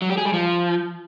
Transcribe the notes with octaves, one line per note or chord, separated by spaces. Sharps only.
F#3
G4
G#4
G3
F3